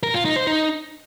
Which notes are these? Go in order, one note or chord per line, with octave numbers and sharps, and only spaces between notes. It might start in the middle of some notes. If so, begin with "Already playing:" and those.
A#4
F4
D#4
C5
D#4